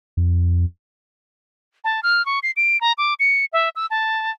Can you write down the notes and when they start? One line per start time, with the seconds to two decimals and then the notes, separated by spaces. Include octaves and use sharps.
0.17 F2
1.84 A5
2.03 F6
2.26 C#6
2.43 C7
2.57 D7
2.81 A#5
2.98 D6
3.20 C#7
3.53 E5
3.76 E6
3.90 A5